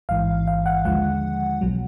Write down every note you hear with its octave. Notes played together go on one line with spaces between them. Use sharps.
A1 G#2 E3 F5
F5
F#5
D#2 D3 F3 G#3 F#5
B1 B2 F#3